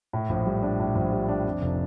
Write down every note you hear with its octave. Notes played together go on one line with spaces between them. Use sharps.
A2
A#1
G3
D4
A2
A#1
G3
D4
F2
F1